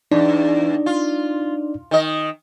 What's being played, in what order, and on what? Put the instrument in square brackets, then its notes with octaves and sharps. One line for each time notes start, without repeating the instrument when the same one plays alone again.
[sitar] E2 [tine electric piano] D4 D#4 D5
[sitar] F4
D#3 D#5